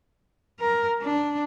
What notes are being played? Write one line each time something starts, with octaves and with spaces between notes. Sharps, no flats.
A#4
D4